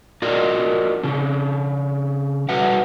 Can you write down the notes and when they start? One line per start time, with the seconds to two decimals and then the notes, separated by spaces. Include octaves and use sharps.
0.22 D4 F4 F#4 A#4 D5 D#5
1.03 C#3 D4
2.49 G3 F#4 B4 E5 F#5